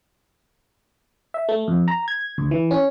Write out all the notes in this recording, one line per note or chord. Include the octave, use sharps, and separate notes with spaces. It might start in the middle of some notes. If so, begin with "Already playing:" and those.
E5
A3
F2
A#5
G#6
D2
E3
C#4